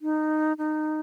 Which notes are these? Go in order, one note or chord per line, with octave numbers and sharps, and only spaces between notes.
D#4
D#4